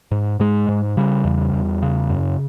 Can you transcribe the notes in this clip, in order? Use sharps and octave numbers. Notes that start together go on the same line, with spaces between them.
G#2
G#2 G#3
G#2
C#3 G3
E2
E2
C#3
F#2